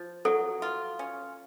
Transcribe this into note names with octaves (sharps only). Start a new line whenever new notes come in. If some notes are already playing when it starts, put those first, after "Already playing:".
Already playing: F3
F#3 A4
F4
C#4